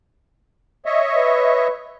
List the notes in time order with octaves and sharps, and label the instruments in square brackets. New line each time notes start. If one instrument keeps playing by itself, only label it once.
[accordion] C#5 D#5 E5
[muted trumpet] B4